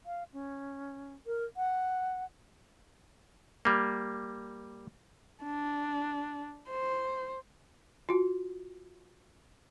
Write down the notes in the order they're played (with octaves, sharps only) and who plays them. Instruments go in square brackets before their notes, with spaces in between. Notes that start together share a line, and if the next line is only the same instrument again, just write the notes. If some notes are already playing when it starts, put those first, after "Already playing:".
[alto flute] F5
C#4
A#4
F#5
[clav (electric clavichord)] G3 A#3
[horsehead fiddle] D4
C5
[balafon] F4 F#4